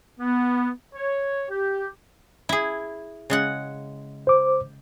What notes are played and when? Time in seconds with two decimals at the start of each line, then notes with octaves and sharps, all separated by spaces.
0.20 B3
0.94 C#5
1.50 G4
2.49 E4 G#4
3.30 C#3 G#3 F#5
4.27 C5 D6